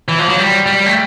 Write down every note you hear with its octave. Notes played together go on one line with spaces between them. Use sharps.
E3
F3
F#3
G3
G3
A3